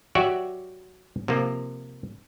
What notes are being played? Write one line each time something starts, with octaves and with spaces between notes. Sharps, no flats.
F#3 F#4 G4 D5 E5
C3 F3 A#3